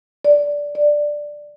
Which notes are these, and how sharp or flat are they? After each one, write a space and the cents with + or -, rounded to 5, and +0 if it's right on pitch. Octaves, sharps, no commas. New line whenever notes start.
D5 -10
D5 +5